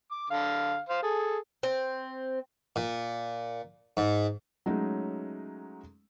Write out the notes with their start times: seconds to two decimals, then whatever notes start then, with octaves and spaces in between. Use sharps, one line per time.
0.11 D6
0.30 D3 F5
0.89 C5 F5
1.03 G#4 A4
1.63 C4
2.76 A#2
3.97 G#2
4.66 F#3 G#3 A3 C#4 D#4